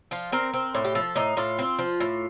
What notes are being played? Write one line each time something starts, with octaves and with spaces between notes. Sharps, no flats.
F3 F4
C4 A#4
C4
A2
G4
F3 A4
A2 D#4
A2 F4
C4
F3
A2